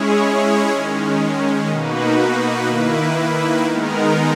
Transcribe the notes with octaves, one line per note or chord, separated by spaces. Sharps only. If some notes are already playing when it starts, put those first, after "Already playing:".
Already playing: G#3 C#4 E4 G#4 C#5
D#3 G#3 C#4
B2 A#3 D#4 F#4 B4
D#3 A#3 E4 B4
D#3 G#3 B3 D#4 A#4